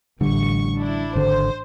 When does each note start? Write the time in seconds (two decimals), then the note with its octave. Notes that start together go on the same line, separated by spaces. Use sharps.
0.21 A1 D3 G3 C#6
0.79 D4 E4
1.15 G#1 D3 C5